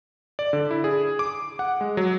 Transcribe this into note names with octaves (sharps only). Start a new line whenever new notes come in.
D5
D3
E4
G#4
D6
F#5
G#3
F#3